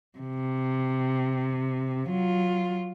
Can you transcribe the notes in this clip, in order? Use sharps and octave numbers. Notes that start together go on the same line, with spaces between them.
C3
F#3 F4